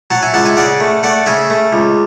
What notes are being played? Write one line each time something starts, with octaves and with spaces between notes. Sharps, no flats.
F#3 F#5 A5
E5 G#5
C#2 F#5 A5
E5 G#5
C#3 D5 F#5
A3
A3 D5 F#5
C#3 E5 G#5
A3
C#2